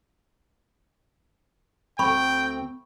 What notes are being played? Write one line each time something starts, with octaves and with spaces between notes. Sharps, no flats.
D2 C4 G5 B5 C#6